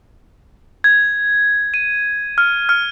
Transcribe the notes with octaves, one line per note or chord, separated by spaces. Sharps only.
G#6
D#7
F6
F6